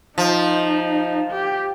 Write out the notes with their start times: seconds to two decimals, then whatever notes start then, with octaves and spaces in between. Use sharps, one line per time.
0.17 F3 D#4
1.31 G4